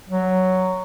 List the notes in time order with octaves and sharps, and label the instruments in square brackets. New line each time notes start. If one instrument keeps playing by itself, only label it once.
[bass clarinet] F#3